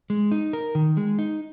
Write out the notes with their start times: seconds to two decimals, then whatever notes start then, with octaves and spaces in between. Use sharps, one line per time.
0.10 G#3
0.31 D#4
0.53 A#4
0.75 D#3
0.97 G#3
1.19 D#4